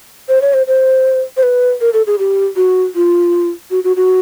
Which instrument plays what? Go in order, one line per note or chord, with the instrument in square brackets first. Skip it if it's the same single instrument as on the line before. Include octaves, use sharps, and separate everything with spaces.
[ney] C5
C#5
C5
C5
C5
B4
A#4
A4
G#4
G4
F#4
F4
F#4
F#4
F#4